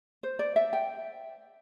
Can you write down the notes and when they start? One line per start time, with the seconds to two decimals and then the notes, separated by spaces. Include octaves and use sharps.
0.23 C5
0.39 D5
0.56 E5
0.73 G5